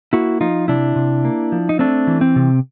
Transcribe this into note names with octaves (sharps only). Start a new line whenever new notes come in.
A#3 E4 F#4
F3 D#4 F4
C3 D4 E4
C3
A#3
F3
D#4
A3 C4 D4
E3
C4
C3